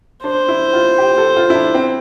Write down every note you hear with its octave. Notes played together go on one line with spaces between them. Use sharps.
D4 C5
E4
F4
G4
A4
F4
E4
D4
C4